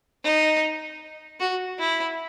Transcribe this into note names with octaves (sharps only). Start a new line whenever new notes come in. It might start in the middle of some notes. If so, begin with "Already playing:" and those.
D#4
F#4
E4